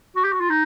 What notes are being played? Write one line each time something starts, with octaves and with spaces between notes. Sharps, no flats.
F#4
G4
F#4
F4
D#4